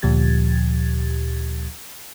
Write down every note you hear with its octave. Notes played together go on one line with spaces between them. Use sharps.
D2 A#2 F3 G4 G#6 A6